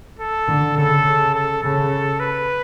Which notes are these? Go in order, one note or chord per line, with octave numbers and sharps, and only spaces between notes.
A4
D3
C#3 A4
C#3
A4
C#3 A4
B4